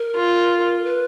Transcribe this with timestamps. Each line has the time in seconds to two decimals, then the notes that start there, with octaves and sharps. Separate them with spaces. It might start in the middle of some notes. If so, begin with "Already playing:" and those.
Already playing: A#4
0.16 F4
0.85 B4